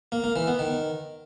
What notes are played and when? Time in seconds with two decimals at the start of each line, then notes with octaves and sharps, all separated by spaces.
0.12 A#3
0.24 A#3
0.36 E3
0.47 B3
0.59 D#3